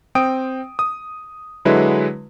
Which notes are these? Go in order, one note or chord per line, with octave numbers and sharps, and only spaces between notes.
C4 G5 D#6 D7
D#6
D3 F#3 G#3 E4 B4